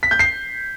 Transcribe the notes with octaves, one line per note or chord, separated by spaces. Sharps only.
B6
G6
C7